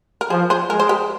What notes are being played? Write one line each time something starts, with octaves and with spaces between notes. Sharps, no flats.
A#4
F3 G#4 C5
G#4 C5
G#3 A#4
C5
G4 A#4